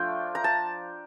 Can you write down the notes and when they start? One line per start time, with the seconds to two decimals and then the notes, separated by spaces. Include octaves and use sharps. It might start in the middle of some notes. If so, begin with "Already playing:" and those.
Already playing: F3 A3 D4 F4 G5
0.35 A#5
0.44 A5